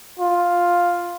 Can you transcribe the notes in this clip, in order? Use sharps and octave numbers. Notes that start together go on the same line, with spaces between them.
F4